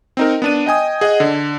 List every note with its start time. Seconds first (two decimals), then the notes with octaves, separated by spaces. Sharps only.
0.17 C4 D#4 A#4
0.42 B3 D4 D#7
0.66 D#5 G5 G#5 D#6
1.01 G#4 D#5 F#5
1.20 D3